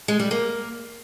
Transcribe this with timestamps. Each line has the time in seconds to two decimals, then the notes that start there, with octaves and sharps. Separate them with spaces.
0.08 G#3
0.20 G3
0.31 A#3